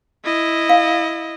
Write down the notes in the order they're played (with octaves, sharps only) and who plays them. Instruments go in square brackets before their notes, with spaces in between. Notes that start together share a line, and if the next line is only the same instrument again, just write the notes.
[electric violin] E4 D#5
[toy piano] F5